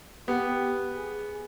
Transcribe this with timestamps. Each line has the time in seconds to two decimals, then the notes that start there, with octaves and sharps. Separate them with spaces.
0.28 B3 G4
0.96 G#4